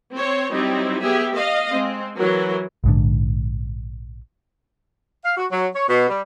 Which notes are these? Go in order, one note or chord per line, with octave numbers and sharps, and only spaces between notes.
C4 C5 C#5
F#3 G3 C4 D#4 E4
B3 G4 G#4 E5
D#5 F5
G#3 C4
E3 F#3 F#4 A#4
A#1 G#2 D3
F5
F#4
F#3
C#5
B2
G3